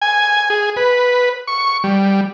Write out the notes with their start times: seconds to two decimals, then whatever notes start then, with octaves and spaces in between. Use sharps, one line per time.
0.02 G#5
0.50 G#4
0.76 B4
1.47 C#6
1.84 G3